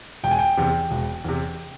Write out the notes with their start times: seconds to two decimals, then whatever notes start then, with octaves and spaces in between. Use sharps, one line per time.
0.24 E1 G5
0.31 G#5
0.39 G5
0.57 E2 C3
0.91 E1
1.24 E2 C3